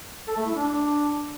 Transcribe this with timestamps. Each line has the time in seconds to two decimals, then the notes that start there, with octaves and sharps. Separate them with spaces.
0.28 A4
0.37 A3
0.46 E4
0.55 D4